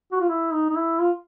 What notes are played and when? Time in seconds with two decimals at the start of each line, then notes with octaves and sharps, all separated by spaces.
0.12 F#4
0.21 F4
0.29 E4
0.53 D#4
0.69 D#4
0.76 E4
1.00 F4